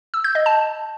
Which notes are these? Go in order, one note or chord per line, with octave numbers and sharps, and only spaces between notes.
E6
G6
D#5
A5